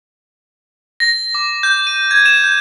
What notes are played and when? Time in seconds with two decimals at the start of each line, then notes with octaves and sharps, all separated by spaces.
1.00 A#6
1.35 D6
1.63 G6
1.87 D#7
2.11 G#6
2.26 E7
2.44 G6